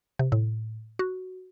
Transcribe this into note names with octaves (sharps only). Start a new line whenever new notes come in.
C3
A2
F#4